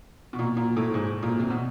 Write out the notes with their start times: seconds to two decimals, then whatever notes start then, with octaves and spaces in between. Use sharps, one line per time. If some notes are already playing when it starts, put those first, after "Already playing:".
0.33 B2
0.39 A#2
0.57 A#2
0.77 A2
0.94 G#2
1.23 A#2
1.40 C3
1.50 B2